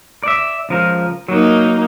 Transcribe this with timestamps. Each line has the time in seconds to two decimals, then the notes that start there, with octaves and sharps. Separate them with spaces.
0.23 D5 E5
0.69 C#2 F3 A#4
1.29 F#3 A#3 D#4